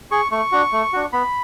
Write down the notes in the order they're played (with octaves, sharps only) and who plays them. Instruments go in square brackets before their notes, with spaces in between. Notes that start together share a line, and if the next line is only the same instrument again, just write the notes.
[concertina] G#4 C#6
A3 C#6
D4 F#4
A3
D4 F#4
B3 B5